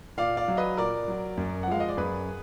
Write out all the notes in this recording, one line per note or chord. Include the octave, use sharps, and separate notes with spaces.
A#2 D5 F5
D5 F5
F#3
B4 D#5
A#2 A#4 D5
F#3
F#2
F#5
F3 G#3 F5
D#5
D5
F#2 G#4 B4